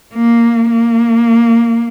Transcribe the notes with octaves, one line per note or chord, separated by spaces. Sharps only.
A#3
A#3